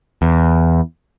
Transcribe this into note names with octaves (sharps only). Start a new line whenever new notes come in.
E2